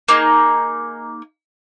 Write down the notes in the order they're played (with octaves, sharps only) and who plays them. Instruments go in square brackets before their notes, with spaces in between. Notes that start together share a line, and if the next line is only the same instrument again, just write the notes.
[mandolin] A#3 D#4 G#4